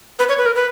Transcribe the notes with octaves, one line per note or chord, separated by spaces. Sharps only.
B4
C#5
B4
A#4
B4